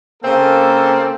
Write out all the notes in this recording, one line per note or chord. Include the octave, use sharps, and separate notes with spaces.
C#3 A#3 C4 A4